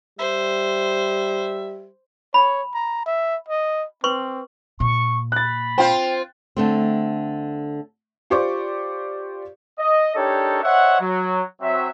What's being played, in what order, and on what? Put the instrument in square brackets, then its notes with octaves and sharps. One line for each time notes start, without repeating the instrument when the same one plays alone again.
[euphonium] G3 [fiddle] C5 [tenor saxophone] E5
[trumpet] C#5 [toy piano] B5
[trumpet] A#5
E5
D#5
[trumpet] C4 [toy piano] B4 C6 C#6
[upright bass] A#2 [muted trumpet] C#6
[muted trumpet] B5 [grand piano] F#6 A6
[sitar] C4 F4 C5 [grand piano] G5
[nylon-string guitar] D3 A3 C4
[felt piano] F4 G4 C5 D5 C#6 D6
[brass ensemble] D#5
D4 D#4 G4 A4 A#4 C#5
C5 C#5 D#5 E5 F#5
F#3
F#3 C4 E5